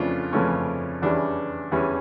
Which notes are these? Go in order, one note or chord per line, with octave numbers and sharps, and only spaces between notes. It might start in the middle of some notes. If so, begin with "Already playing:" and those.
Already playing: F2 C#3 E3 A3 C#4 D4 F4
F2 C#3 E3 A3 C#4
E2 E3 G3 C#4 D4
E2 E3 G3 C#4